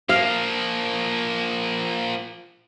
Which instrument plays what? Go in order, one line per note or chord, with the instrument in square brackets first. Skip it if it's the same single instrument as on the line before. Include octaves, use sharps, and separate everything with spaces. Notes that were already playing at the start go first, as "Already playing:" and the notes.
[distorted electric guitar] F3 A#3 [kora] F5